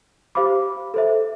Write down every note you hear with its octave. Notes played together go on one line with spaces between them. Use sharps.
G4 C5 F5 B5 D6
A4 C5 E5